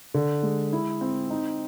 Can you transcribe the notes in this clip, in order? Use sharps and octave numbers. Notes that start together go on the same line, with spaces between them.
D3
G#3
E4
C4
D#4